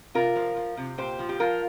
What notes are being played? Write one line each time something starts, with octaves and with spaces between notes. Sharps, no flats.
C3 F4 A#4
F3
F3
C3
A#2 G4 C5
F3
G4
F3 F4 A#4